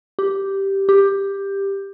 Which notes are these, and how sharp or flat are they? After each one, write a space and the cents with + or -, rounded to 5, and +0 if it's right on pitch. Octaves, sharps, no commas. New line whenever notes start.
G4 -5
G4 +10